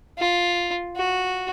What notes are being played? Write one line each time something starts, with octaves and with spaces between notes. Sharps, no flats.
F4
F#4